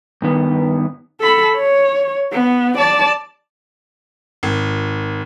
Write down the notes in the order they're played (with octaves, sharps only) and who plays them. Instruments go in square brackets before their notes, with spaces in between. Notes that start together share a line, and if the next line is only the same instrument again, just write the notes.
[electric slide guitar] G2 D#3 B3
[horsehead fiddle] A4 B5
C#5
B3
D5 A5
[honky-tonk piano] G#1